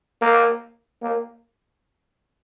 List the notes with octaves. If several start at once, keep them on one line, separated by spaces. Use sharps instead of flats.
A#3
A#3